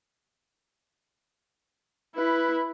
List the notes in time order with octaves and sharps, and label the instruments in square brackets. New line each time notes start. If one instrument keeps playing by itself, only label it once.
[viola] E4 [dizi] B4